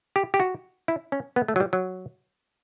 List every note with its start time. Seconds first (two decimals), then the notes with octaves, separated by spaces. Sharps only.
0.16 G4
0.34 G4
0.40 F#4
0.88 E4
1.12 C#4
1.36 B3
1.48 A3
1.56 F#3
1.60 G3
1.73 F#3